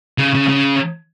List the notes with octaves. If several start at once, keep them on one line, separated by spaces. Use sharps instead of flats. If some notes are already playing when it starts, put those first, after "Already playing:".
C#3
C#3
C#3